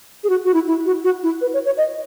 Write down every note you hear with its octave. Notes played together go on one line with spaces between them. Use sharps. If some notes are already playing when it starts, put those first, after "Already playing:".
G#4
F#4
F#4
E4
E4
F#4
F#4
E4
B4
C#5
C#5
D#5